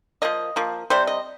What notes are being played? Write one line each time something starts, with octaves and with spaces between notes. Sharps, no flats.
F3 A#3 D#5
F3 A#3
C3 G3 C5
D#5